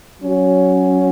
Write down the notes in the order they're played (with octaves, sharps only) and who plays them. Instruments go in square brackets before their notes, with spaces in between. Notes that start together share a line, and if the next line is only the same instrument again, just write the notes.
[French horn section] F#3 C#4 F#4